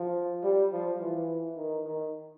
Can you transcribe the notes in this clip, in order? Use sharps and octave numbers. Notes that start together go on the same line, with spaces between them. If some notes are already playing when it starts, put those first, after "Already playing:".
Already playing: F3
G3
F3
E3
D#3
D#3